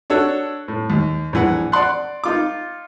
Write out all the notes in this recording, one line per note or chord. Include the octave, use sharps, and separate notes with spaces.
D4 F#4 A4 C#5
A2
D#2
A#1 E3 F#5
D5 F#5 C6 F#6
D#4 F4 D6